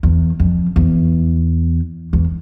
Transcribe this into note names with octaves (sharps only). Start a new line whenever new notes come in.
E2
F2
E2
E2